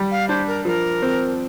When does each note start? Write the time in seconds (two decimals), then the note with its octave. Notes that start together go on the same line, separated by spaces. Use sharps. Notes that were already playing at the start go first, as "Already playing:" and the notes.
Already playing: G3
0.11 F5
0.29 D4 C5
0.47 A#4
0.65 F3 A#4
1.02 C4